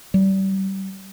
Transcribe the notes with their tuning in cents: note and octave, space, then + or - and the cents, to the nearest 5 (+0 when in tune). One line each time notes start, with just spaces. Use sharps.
G3 -25